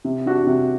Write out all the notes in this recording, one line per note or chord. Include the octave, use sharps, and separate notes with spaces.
C3
G3 D4 F#4
C3